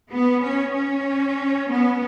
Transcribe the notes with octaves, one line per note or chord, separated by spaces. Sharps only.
B3
C#4
C#4
B3